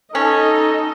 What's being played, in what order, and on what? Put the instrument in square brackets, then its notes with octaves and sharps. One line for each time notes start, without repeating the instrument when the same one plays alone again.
[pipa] C#4 [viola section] D#4 D#5 [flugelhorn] A4